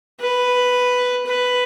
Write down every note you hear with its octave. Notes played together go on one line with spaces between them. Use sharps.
B4
B4